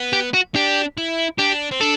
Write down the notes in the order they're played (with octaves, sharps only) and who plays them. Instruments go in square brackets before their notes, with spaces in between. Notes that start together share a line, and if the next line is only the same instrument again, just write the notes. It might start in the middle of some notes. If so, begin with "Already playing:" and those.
Already playing: [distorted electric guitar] B3
[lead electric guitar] G4
F#4
[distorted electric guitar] D4 [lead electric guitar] G4
[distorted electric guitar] E4
[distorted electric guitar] D4 [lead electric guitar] G4
[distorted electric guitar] C4
[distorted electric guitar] D4 [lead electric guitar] A4